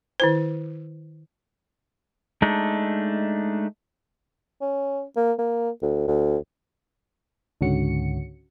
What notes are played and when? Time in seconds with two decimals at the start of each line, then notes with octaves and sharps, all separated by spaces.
0.20 D#3 E4 C5
2.42 G#3 A3 D4 D#4
4.61 C#4
5.16 A#3
5.39 A#3
5.82 D2
6.08 D2
7.61 C#2 G#2 D3 C#4 F#4 C#7